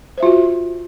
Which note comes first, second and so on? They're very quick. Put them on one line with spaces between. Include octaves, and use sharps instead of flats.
C5 E5 F4 F#4